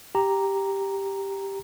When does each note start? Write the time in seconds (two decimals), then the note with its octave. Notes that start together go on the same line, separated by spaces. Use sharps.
0.15 G4 A#5